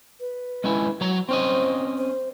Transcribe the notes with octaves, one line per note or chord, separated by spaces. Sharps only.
B4
G#3 C#4 E4
F#3 C#5 A#5
C4 C#4 C5 D#5
C5